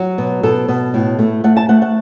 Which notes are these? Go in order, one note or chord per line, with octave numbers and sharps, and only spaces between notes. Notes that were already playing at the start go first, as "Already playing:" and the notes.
Already playing: F#3 F#4
B2
B2 A4
B2
A2
A3
A3 F#5
A5
A3 F#5
F#5